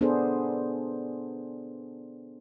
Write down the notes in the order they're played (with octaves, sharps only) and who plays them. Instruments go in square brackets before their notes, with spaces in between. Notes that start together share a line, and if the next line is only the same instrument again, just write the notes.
[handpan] B3 D4 G#4 A4 C5